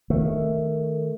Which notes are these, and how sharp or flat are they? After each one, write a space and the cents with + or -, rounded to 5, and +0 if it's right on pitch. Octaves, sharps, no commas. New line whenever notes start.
D#3 +0 A3 +0